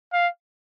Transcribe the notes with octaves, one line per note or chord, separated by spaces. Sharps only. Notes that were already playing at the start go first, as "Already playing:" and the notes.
F5